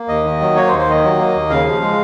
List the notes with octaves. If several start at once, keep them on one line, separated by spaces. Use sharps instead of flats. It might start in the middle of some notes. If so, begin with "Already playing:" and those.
Already playing: A#3
D#2 D#5
D#3
F#3
A#3 C#5
C5
D#2
C5
D#3 D#5
F#3
A#3
D#2
C#3 F5
F3
G#3